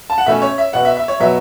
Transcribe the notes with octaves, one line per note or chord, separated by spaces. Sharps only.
A5
F#5
B2 A3 C#4 E5
C#5
E5
B2 B3 F#5
E5
E5
C#5
B2 F#3 B3 E5